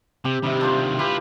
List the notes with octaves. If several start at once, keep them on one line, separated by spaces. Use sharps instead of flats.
C3 G4
C3 D#3 G3 E5
D4 F4 C5
E4 F4 G4 B4